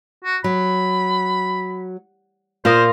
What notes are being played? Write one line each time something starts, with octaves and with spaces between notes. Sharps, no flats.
F#4
F#3 B5
A#2 F4 A#4 C5 D#6